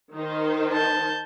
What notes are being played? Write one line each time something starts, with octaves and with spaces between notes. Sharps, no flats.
D#3 D#4 C5
A5 G6